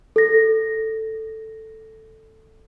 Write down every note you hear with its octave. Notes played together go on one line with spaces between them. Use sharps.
A4 A#6